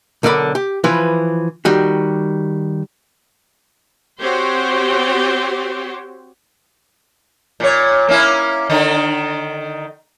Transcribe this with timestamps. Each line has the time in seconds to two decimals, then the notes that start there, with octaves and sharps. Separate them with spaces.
0.23 B1 D3 A#4 D5 B5
0.55 G4
0.84 E3 F3 B4
1.65 D#3 G3 F#4
4.21 C4 F#4 G4 C5 C#5
7.60 A#2 C#5
8.08 A#3 C#4 E4
8.69 D3 D#3 D#4